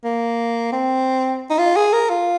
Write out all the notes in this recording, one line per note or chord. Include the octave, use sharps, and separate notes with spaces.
A#3
C4
D#4
F4
G#4
A#4
F4